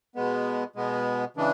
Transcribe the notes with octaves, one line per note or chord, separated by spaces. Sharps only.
B2 G#3 B3
B2 G#3 B3
C#3 E3 G#3 D4